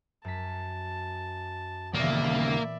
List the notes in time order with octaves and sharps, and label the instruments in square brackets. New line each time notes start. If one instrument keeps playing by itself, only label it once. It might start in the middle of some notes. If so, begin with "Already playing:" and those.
[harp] F#2 B6 [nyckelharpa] A5
[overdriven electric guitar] D#2 C#3 [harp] A#2 E3 B3 [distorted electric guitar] A#3 [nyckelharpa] D5 E5